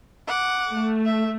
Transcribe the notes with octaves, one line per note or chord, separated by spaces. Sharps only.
F#5 D6
A3
E5